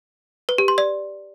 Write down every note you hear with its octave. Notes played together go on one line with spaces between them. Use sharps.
B4
G4
C6
D5